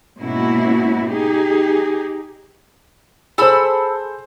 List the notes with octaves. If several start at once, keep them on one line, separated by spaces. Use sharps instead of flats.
G#2 B2 A#3 C#4 E4 F#4
D#4 G4 G#4
G#4 A4 C5 B5 E6